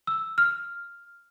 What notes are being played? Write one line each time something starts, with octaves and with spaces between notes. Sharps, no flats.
E6
F6